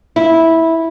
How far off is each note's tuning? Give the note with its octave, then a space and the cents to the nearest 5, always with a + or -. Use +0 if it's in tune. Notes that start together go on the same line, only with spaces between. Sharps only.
E4 -10